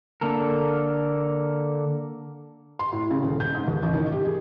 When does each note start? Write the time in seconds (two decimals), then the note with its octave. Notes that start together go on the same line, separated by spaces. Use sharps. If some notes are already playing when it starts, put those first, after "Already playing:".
0.21 D3 A#3 A4 A#4
2.79 C6
2.93 A2
3.11 C#3
3.23 D#1
3.40 G6
3.55 G#2
3.68 D#2
3.83 A1
3.94 D#3
4.12 G4
4.25 G#4